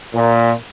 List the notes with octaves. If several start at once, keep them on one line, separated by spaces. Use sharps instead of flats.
A#2